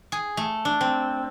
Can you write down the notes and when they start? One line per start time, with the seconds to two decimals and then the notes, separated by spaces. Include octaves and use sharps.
0.12 G#4
0.37 A3
0.65 D4
0.81 C4